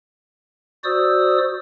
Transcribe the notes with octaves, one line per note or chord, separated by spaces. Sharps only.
F#4 C5 D5 D#6 E6